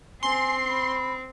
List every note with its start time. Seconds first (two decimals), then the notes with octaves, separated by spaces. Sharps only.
0.23 C4 G#5 C6
0.70 B5